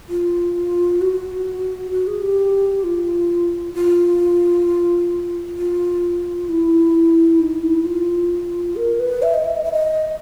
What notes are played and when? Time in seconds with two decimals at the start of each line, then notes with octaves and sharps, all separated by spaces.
0.09 F4
1.01 F#4
1.92 F#4
2.07 G#4
2.22 G4
2.84 F4
3.74 F4
5.58 F4
6.49 E4
7.40 D#4
7.63 E4
7.85 F4
8.76 A#4
9.00 B4
9.22 E5
9.34 D#5
9.44 E5
9.56 D#5
9.64 E5
9.72 D#5